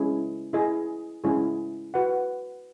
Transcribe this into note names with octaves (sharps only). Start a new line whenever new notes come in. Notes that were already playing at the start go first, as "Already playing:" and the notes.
Already playing: G#3 C#4 E4 G#4
E4 G#4 D#5
G#3 C#4 E4 G#4
F#4 B4 F#5